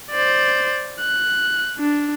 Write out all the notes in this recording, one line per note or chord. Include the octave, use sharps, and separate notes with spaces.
C5 D5
F#6
D4